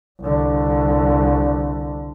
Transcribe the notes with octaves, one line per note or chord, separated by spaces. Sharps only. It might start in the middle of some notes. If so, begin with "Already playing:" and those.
C2 D3